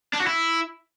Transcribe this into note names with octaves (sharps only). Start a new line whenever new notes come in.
D4
F#4
E4